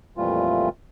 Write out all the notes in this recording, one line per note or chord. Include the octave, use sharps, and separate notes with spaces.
F2 A#2 E3 G3 A3 F4